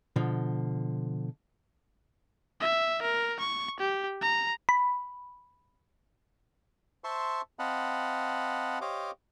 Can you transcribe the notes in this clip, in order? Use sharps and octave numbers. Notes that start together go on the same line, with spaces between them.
B2 D3 F3
E5
A#4
C#6
G4
A#5
B5
C5 E5 A5 C6 C#6
C4 D#5 F5 F#5 A5 B5
G4 C5 C#5 D#5 F5 D6